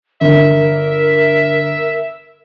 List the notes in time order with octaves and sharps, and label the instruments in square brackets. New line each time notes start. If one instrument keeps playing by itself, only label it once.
[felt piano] G1 [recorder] A#4 [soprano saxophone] E5